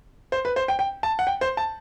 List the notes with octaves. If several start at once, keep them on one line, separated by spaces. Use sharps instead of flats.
C5
B4
C5
G5
G5
A5
F#5
G5
C5
A5